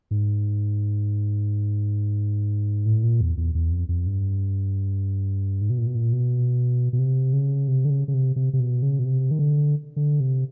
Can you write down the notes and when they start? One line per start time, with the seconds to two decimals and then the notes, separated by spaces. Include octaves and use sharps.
0.11 G#2
2.86 A2
3.03 A#2
3.21 E2
3.37 E2
3.54 E2
3.71 F2
3.88 F2
4.07 G2
5.61 G#2
5.70 B2
5.78 A#2
5.87 B2
5.95 A#2
6.13 B2
6.93 B2
6.99 C3
7.33 C#3
7.68 C3
7.85 D3
7.90 C#3
8.08 C#3
8.14 C3
8.36 C3
8.53 C3
8.60 B2
8.82 C#3
8.99 B2
9.05 C3
9.31 D#3
9.39 D3
9.96 D3
10.20 C3